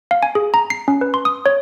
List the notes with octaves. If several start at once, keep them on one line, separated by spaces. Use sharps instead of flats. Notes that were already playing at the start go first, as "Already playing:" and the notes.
F5
G#5
G#4
A#5
C7
C#4
B4
C6
D#6
C#5